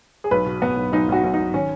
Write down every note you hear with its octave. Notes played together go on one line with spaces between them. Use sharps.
G#4
B1 B4
B2
B2 B3
B1
B1 D#4
B1 F#4
B1
B1 D#4
D#3 C#4